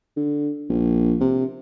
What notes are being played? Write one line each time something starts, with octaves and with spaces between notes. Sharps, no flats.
D3
A#1
C3